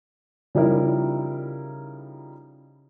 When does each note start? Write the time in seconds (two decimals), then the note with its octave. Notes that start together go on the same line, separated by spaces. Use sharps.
0.55 C#3 F3 G3 D#4 E4 A#4